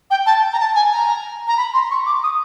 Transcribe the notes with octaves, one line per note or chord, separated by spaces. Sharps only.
G5
A5
A#5
A5
G#5
A#5
A#5
B5
C6
C#6
D6
D#6